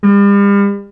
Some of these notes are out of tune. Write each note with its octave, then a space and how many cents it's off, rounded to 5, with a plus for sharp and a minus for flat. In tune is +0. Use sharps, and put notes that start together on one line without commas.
G3 +40